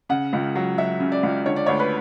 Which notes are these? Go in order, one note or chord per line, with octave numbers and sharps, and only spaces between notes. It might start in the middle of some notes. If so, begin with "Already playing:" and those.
C#3 F#5
C#2
F#3
F#3 E5
C#3
D5
C#2
D3 C#5
D5
D2 C#5
B4